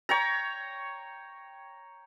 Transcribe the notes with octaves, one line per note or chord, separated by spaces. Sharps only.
C#5 G5 A#5